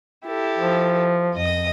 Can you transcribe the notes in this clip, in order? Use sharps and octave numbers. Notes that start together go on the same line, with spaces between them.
E4 G4 A4
F3
F2 D#5 D#6